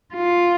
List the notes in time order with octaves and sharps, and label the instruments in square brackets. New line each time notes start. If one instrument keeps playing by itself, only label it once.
[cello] F4